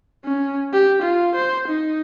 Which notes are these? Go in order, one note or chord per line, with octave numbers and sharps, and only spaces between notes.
C#4
G4
F4
C5
D#4